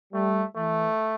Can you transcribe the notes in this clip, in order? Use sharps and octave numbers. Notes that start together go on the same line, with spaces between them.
G3 A3
E3 A3